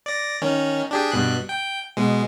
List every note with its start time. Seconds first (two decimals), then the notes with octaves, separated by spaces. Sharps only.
0.06 D5 A#6
0.42 D#3 C#4
0.91 D4 G4 G#4
1.12 G2 B2 F#6
1.49 G5
1.97 B2 G#3